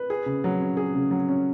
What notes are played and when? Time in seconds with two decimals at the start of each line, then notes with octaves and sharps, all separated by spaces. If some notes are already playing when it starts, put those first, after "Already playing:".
Already playing: B4
0.10 G#4
0.26 C#3
0.44 F#3
0.61 C#4
0.77 G#4
0.95 C#3
1.11 F#3
1.28 C#4